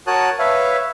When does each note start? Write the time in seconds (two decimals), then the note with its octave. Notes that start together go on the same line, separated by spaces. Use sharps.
0.07 F#4 A#4 C#5 A5 D#6 F#6
0.39 B4 C#5 E5 F5